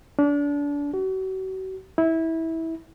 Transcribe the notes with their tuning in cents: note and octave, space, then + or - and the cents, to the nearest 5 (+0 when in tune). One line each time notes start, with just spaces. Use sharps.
D4 -30
F#4 +40
E4 -20